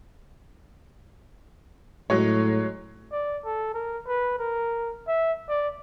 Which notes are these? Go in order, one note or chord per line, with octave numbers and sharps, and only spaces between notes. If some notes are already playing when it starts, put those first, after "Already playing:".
A2 F#3 G#3 C#5
D5
A4
A#4
B4
A#4
E5
D5